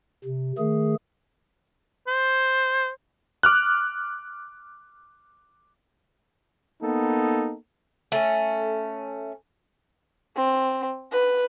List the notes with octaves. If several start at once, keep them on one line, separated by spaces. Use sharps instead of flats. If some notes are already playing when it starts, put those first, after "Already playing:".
C3
D#3 A3 G#4
C5
D6 F6 F#6
A#3 B3 D#4 A4
A3 C#4
C4
B4